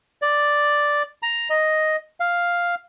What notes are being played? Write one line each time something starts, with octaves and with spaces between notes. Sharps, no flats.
D5
A#5
D#5
F5